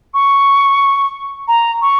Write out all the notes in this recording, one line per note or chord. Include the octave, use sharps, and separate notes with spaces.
C#6
A#5
C#6